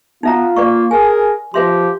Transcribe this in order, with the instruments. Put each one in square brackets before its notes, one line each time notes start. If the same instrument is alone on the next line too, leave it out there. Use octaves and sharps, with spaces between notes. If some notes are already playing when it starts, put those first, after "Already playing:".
[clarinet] B3 [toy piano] D#4 E5 A#5 [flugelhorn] F4
[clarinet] A#3 [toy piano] B4 D5 C#6
[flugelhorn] G#4 [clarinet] A#4 [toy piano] G#5
[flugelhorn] F3 [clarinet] G4 [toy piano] B4 E5 C6